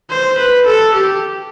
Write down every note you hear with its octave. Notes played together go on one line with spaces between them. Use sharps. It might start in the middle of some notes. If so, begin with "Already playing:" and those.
C5
B4
A4
G4